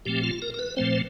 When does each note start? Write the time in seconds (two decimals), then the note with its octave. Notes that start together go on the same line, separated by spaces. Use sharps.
0.05 A#2 F3 A3 C4 G4
0.23 F4
0.42 A#4
0.54 A#4
0.59 B4
0.77 A#2 F3 A3 C4 C5